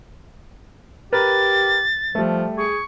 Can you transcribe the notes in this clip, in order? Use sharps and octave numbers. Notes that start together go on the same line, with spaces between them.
G4 A#4 B4 A6
F3 G3 A3
G#4 C#6